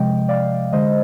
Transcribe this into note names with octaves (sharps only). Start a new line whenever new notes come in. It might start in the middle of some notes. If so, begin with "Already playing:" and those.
Already playing: C3 F3 G#3 D#5 G5
D5 F5
D3 G#3 C5 D#5